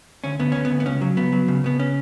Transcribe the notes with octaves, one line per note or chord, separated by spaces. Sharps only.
D2 C#4
D2 B3
D2 C#4
B3
D2
B3
C#2 C#4
F#3
C#2 B3
F#3
C#3
C#3 B3
C#4